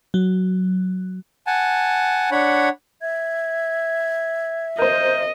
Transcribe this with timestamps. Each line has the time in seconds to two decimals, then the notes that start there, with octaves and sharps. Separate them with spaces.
0.14 F#3
1.47 F#5 G#5 A5
2.31 D4 C#5 F#5 B5
3.02 E5 G#6
4.78 A#4 C5 D#5 G6